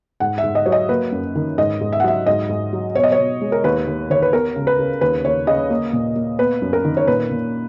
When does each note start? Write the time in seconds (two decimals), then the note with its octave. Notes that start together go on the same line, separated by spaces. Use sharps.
0.20 G#2 F#5
0.38 E5
0.43 G#2
0.55 D#5
0.66 F#3 C#5
0.72 D#5
0.89 A#3 B4
1.12 F#2
1.35 D#3
1.58 G#2 D#5
1.81 G#2
1.93 E5
2.00 F#5
2.04 F#3 E5
2.26 G#2 D#5
2.49 G#2
2.73 F#3
2.95 B2 C#5
3.03 D#5
3.12 C#5
3.18 B2
3.41 G#3
3.52 A#4
3.64 D#2 B4
3.87 D#2
4.10 D#3 C#5
4.22 B4
4.33 B3 A#4
4.56 C#2
4.67 B4
4.79 C#3
5.01 D#2 B4
5.25 D#2 C#5
5.47 C#3 D#5
5.70 A#3
5.93 A#2
6.16 A#3
6.39 B3 B4
6.62 F#2
6.73 A#4
6.85 D#3
6.97 C#5
7.07 A#2 B4
7.30 A#2